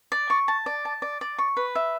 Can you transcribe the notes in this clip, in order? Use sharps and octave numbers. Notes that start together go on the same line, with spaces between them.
D5
C#6
A5
D5
A5
D5
D5
C#6
B4
E5